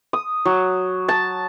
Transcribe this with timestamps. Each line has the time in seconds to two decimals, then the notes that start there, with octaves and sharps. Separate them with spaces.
0.13 D#6
0.45 F#3
1.09 A5